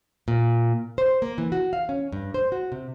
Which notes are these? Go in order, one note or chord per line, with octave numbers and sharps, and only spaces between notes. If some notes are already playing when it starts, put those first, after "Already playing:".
A#2
C5
A#3
E3
F#4
F5
C#4
G2
C5
F#4
C3